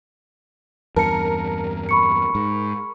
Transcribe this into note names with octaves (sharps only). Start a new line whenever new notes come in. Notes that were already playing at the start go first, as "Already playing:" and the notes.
E2 G2 A#4 A5 C#7
B5 C#6 C#7
G#2